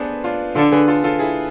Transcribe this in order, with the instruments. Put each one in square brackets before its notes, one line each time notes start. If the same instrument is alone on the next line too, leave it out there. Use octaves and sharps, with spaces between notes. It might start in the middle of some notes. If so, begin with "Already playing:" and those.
Already playing: [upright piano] B3 D4 G#4 A4 B4 C5
D4 F4
[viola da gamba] D3 [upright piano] F4 A4
[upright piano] G#4 B4
F4 A4
F4 A4
E4 G#4